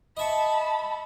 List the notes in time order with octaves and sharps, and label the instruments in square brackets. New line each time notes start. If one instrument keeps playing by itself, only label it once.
[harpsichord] D#5 E5 C#6 [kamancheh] A5 B5